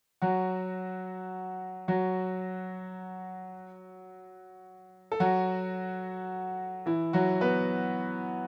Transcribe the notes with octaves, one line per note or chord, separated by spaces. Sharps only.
F#3 F#4
F#3 F#4
A4
F#3 F#4
E3 E4
F#3 F#4
B3 B4